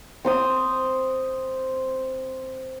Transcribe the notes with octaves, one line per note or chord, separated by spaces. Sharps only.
C4 C6 D#6